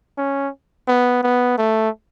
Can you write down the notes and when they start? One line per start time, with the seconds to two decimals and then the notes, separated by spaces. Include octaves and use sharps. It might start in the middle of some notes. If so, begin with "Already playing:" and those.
0.18 C#4
0.88 B3
1.23 B3
1.58 A3